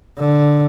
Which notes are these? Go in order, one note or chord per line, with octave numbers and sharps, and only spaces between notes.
D3